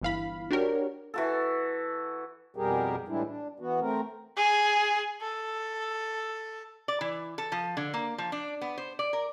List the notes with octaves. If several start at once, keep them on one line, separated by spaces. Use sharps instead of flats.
G1 E3 F5 B5
D4 F#4 G4 A#4 C#5
E3 F#4 A4
F2 B2 G3 G4 G#4 A#4
A2 E3 G3 G#3 D4 E4
D4
E3 B3 F#4
A3 C4 A#4
G#4
A4
D5
E3
A4
F3
D3
A#3
F3
D4
B3
C5
D5
A#4